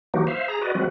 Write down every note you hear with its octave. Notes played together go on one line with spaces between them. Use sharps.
E3 F#3 A#3 D#4 F#4 G4
C5 E5 F5
G#4 A#5
F#4 B4 D5 D#5
F3 F#3 G#3 C4 F#4 B4